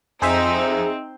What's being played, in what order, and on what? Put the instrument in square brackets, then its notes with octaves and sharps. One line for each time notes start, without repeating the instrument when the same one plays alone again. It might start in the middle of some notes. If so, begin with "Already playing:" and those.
[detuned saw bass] F2 [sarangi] C4 [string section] D#4 [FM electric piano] G#4 C5 E5